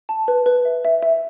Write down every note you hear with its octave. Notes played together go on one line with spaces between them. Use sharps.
A5
B4
B4
E5
E5
E5